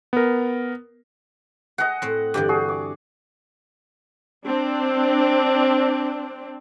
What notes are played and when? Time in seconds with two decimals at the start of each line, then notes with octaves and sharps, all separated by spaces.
0.13 B3 A#4
1.78 G#4 D#5 F#5 A#5
2.02 A2 C4
2.34 G2 D3 E3 G4 D5
2.48 F#4 G#4
2.69 D6
4.46 C4 D4